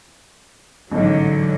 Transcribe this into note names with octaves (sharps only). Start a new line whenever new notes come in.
A1 G#2 D3 F#3